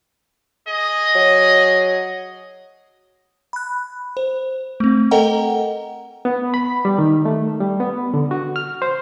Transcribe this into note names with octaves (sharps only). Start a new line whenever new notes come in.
G#4 D#5
F#3
B5 F#6
C5
A3 C4
A4 A#4 D#5 F#5 G5 A#5
B3
B5
G3
D#3
A3
G3
B3
D3
F#4
F6
C5